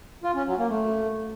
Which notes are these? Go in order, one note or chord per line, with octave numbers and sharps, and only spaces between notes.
F4
C#4
F#3
A#3
A3